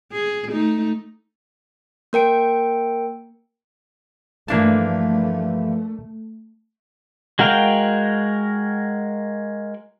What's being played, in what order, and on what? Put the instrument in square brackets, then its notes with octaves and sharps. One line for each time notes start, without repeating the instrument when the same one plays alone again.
[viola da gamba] G#4
A3 D#4
[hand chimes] A#3 A#4 G5 D7
[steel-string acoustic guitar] G2 E3 F3 [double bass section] A3 [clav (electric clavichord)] A#3 D4 A5
[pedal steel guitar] G#3 F#4 A#4 F5 G5